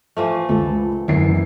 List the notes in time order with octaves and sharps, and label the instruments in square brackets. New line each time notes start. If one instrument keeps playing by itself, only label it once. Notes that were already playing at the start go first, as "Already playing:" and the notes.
[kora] E3 F3 A3
[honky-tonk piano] C#2 [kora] A4
[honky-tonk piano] F#1 E2 C7 [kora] E4